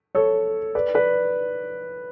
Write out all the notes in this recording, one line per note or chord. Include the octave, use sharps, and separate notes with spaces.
A4 C#5
B4 D5
B4 D5